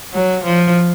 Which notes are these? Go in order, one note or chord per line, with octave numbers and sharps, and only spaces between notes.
F#3
F3